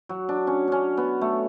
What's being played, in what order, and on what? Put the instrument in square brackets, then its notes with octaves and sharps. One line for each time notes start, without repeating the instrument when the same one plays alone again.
[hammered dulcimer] F#3
D4
C#4
C#4 D4
B3
A3